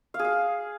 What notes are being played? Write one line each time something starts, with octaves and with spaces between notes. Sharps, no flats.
F5
G#4
F5